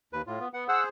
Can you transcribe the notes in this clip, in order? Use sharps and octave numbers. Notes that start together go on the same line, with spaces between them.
D#2 B4
A2 F4
B3
B3 F#5
G#4 C5 F#5 E6